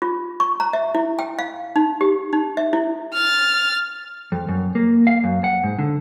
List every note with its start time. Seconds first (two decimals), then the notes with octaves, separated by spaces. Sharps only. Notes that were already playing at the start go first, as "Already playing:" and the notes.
0.02 F4
0.40 C#6
0.60 A#5
0.73 E5
0.95 E4
1.19 G5
1.39 F5
1.76 D#4
2.01 G4
2.33 D#4
2.57 E5
2.73 E4
3.14 F6 A6
4.32 F2
4.49 F#2
4.75 A#3
5.07 F5
5.24 F#2
5.44 F#5
5.63 G#2
5.79 D3